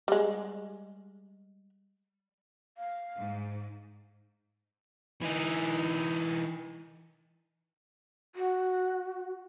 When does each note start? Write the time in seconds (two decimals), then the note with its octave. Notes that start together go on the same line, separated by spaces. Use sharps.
0.08 G3 G#3
2.77 F5
3.16 G#2
5.22 E3 D#4
8.36 F#4